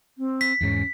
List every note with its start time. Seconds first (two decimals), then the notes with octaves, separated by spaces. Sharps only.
0.18 C4
0.41 B6
0.61 E2 G#2 C#4